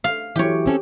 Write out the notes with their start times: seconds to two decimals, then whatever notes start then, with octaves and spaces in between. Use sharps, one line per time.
0.04 F5
0.36 E3 F#3 G4 C#5
0.66 C4 C#4 A4